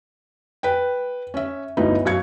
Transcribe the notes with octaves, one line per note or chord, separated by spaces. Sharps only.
B4 G5
C#4 E5
G1 D2 D#4 E4 B4
F#2 F5 G#6 C#7